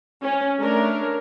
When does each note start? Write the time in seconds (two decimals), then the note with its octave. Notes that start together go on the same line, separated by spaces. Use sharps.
0.22 C#4
0.59 A3 D4 A#4 C#5